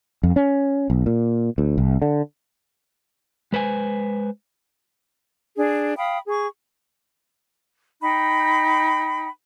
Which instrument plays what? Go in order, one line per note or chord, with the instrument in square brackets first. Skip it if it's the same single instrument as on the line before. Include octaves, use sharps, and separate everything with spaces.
[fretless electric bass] F2
C#4
B1
A#2
D2
C2
D3
[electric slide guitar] G#3 B4 C5 G#5
[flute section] D4 G#4
F5 G5 B5 D#6
G#4 C#6
D#4 G5 B5